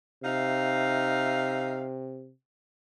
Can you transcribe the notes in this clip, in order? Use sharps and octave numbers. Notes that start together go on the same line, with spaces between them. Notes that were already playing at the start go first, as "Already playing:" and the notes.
C3 D#4 E5 F5